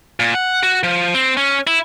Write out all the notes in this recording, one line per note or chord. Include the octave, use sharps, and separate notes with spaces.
A#2
F#5
F#4
F3
C4
C#4
E4